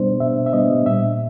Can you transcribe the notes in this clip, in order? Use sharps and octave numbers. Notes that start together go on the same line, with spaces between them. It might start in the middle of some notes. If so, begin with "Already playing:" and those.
Already playing: B2 G3 B3 D4 C5
B2 E5
E5
G3 B3 D4 D#5
A#2 E5